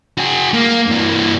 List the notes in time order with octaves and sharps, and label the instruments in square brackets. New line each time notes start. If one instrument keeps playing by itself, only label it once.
[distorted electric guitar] F#4 G#4
A#3
G2 E3